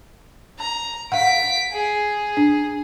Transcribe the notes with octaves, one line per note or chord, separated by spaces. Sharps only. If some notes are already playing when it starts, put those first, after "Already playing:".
A#5
F5 F#5 B6 D7
G#4
D4